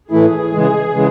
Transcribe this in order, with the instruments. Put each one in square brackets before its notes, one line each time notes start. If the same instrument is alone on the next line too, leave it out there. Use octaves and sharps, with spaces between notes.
[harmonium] A2 E3 A3 E4 [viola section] G#4
[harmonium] C#3 E3 G#3
C#3 E3 G#3